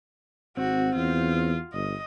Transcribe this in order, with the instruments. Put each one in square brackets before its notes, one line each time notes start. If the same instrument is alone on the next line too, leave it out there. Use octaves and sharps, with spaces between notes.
[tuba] G#1 [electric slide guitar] C4 [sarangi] F#4
[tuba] E2 [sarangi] F4
[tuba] G1 [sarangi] D#5